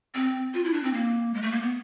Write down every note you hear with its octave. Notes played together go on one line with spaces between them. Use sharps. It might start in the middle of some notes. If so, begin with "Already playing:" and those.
C4
F4
E4
D4
C4
A#3
G#3
A3
A#3
B3